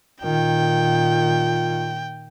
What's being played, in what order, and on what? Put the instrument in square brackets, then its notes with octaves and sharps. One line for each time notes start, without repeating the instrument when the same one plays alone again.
[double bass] A#2 D#3 [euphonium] F4 [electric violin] G5